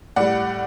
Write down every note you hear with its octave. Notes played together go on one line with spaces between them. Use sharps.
A2 G3 D5 F#5